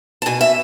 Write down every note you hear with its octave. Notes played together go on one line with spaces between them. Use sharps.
A5
B2 G#5
E5